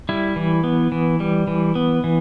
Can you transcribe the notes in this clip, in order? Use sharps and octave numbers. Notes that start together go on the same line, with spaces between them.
G3 E4
E3
B3
E3
G3
E3
B3
E3